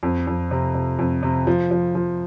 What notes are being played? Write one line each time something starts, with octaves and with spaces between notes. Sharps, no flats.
F2
F2
C3
C3
F2
C3
F3
F3
F3